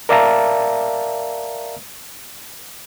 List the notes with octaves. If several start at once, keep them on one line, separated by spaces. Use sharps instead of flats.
A#4 D5 E5 F5 A5 A#5